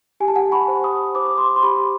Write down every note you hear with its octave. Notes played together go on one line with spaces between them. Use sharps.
G4 G#5
A5
F#5 G#5
B5 C#6
C5
C#6 D#6
C5 D6
C#6
C6 D6
C6
G4 B5 C#6